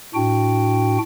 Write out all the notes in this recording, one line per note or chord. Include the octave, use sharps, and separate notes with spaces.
A2 D4 F#4 G5